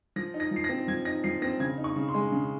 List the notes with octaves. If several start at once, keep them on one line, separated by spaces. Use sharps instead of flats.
F3 A#6
D#4
A#6
F3
C7
A#6
C4
F3 G#6
D#4 A#6
F3 C7
C4 A#6
C#3 G#6
D#4
C#6
C#3
C6
G#3
C#3